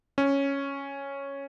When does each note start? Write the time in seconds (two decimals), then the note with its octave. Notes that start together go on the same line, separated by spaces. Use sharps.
0.18 C#4